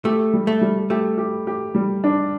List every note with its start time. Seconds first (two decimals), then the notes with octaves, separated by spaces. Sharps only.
0.05 A3 G4
0.33 G3
0.47 A3
0.61 G3
0.90 A3 G4
1.18 G4
1.47 G4
1.75 G3
2.04 D4